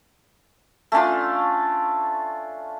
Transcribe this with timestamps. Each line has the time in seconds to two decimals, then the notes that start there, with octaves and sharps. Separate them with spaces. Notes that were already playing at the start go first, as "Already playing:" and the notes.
0.92 A3 C#4 D4 F4